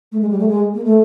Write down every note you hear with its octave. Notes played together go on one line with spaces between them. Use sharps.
A3
G#3
G3
A3
G#3
A#3
A3